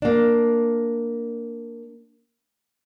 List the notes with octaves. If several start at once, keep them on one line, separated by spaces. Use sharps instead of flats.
A#3 D4